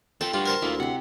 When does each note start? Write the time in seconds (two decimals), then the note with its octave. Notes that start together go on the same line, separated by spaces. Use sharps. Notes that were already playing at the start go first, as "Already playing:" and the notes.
0.21 F3 C4 A4 G5
0.34 G2 G3 F4 F#4
0.46 A#4 C5 A5
0.62 D2 A#3 E4 F4
0.80 C3 F#5 C6